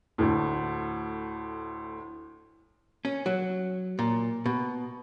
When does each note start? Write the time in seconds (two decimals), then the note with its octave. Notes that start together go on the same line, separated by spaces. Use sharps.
0.18 D2 A2
3.05 C#4
3.26 F#3
3.99 A#2
4.46 B2